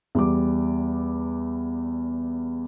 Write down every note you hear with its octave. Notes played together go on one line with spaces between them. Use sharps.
E2 G3 D6